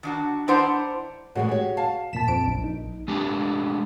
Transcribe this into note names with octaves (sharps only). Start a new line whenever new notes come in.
D#3 D4 F#4
D#3 D4 E4 C5 F#5 A#5
A2 E3 G#3 F#4 G#4 F#5
G4 C#5
F5 A5
E2 A#2 A5 B6 E7
F2 D7
A#1
D#4
G#3 A3 D4 G4